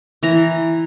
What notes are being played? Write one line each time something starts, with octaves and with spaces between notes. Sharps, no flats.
E3 A#5